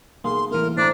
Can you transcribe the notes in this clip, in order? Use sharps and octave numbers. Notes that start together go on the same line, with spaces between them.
B1 A#3 G#4 F5 C6
C2 A2 E3 A#3 A#4
A2 D4 C5 A#5 D6